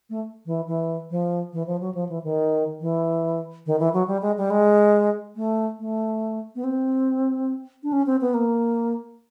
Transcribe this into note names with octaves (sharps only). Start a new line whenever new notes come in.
A3
E3
E3
F3
E3
F3
F#3
F3
E3
D#3
E3
D#3
E3
F#3
G3
G#3
G3
G#3
A3
A3
B3
C4
D4
C#4
C4
B3
A#3